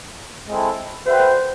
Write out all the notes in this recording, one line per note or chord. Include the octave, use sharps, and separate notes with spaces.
G#3 C4 E4 A4
F#4 B4 C5 E5 G5